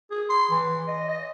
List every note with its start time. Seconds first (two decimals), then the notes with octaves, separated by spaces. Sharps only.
0.11 G#4
0.29 C6
0.51 E3
0.88 D#5
1.08 D#5